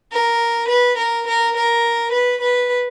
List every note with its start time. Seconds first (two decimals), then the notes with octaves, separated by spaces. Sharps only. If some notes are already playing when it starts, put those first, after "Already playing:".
0.11 A#4
0.69 B4
0.98 A#4
1.27 A#4
1.56 A#4
2.14 B4
2.42 B4